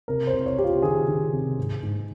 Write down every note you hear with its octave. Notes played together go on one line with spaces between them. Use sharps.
C3 A#4
C5
C2
C#5
C2 G4
F4
D#3 G#4
D#3
C3
G#2
G#2